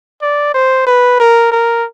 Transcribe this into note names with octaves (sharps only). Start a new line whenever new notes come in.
D5
C5
B4
A#4
A#4